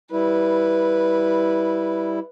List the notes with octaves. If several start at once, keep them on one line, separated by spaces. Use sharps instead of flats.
G3 E4 B4